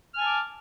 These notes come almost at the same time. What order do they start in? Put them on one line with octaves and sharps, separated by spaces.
F6 G#5 A5 D6